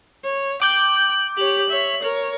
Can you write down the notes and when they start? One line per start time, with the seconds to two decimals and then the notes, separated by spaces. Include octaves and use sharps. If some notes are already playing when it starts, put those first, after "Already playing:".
0.24 C#5
0.62 G5 D6 G6 F#7
1.37 G4 C#5 F#7
1.69 C#5 E5
2.02 A#4 C#5